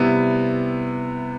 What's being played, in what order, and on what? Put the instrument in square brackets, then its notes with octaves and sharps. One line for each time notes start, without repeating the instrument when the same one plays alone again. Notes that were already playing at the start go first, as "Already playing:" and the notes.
Already playing: [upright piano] C3 G3 B3 E4